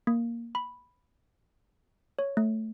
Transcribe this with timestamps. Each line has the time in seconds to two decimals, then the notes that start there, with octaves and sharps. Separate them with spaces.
0.07 A#3
0.55 B5
2.19 C#5
2.37 A3